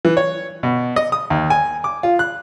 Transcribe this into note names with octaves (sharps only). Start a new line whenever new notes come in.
E3
C#5
B2
D#5
D#6
D#2
G#5
D6
F4
F#6